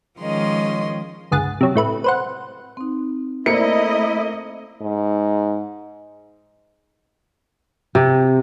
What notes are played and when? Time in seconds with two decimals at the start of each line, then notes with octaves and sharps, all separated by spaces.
0.19 D#3 F3 G#3 C#4 D#5 C6
1.31 G1 C#2 G#4 F#5 A6
1.61 C3 F#3
1.75 A2 A3 B4
2.04 B4 C5 F#5
2.77 C4 D#4
3.46 A3 A#3 E4 C5 D5 D#5 C#7
4.82 G#2
7.95 C3